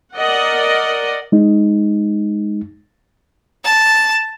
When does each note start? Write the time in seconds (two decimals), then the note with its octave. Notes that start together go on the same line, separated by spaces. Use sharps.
0.14 A#4 D5 D#5 F#5
1.32 G#3 D#4
3.64 A5